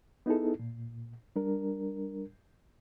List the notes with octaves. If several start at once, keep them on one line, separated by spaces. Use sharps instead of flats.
B3 D#4 E4 G#4 A4
A#2
G3 D4 A#4